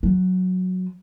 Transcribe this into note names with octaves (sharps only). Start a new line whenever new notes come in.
F#3